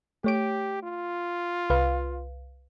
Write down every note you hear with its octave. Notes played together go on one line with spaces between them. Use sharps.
A3 G4 C#5 D7
F4
C2 B4 F5